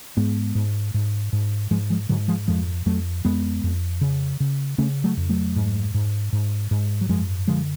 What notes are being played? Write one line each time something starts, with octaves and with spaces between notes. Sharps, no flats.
G#2 G#3 B3
G#2
G#2
G#2
G#2 F3 G#3
F3 G#3
G#2 D3 F#3
F3 G#3
F2 F3 G#3
F2 F#3 A3
F2 G#3 B3
F2
C#3
C#3
C#3 A3 C#4
F#3 A3
F2
F#3 A3
G#2
G#2
G#2
G#2
F#3
F#2 F3 G#3
D3 F3 G#3